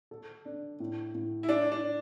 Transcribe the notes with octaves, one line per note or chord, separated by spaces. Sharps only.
A4
D4
A2
A2
E4
A3 D4
D4
A3